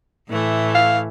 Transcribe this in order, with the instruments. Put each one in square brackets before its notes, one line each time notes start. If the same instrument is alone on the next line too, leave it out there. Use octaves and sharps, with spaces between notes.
[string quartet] A2 E3 A3
[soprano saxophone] F5